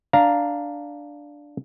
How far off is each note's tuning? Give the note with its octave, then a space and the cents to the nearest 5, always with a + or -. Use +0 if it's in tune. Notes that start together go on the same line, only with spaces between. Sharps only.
D4 +0 F5 +0 A#5 +0